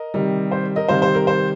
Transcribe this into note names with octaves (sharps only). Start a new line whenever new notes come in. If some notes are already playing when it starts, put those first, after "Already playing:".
Already playing: A#4 D#5
C3 D#3 G3
C5
A#4 D#5
C3 D#3 G3 C5 F5
C5
A#4
C5